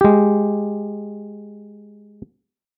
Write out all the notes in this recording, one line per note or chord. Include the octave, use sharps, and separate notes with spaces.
G#3 G4